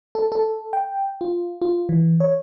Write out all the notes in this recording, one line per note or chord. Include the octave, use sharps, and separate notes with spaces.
A4
A4
G5
F4
F4
E3
C#5